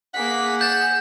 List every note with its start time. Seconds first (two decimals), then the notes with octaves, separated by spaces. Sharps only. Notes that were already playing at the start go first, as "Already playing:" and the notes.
0.14 A#3 G#4 F#5 B6
0.61 G6 A6 E7